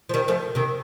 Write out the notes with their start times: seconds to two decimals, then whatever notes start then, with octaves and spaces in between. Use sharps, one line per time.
0.09 F3
0.14 D#3 G3
0.28 F3 A3
0.55 C3 D#3